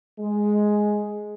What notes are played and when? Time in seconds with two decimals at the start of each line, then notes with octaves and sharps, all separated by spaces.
0.19 G#3